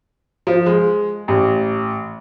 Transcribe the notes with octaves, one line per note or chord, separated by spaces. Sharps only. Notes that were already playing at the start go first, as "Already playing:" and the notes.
F3
G#3
A1